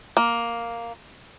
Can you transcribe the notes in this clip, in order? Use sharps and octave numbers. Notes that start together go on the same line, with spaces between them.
A#3